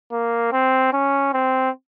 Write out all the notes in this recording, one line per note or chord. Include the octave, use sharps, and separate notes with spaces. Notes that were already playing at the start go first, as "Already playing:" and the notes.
A#3
C4
C#4
C4